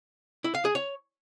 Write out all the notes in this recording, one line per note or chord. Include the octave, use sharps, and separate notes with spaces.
E4
F5
G#4
C#5